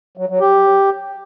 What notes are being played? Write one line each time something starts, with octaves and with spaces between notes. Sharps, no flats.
F#3
F#3
G4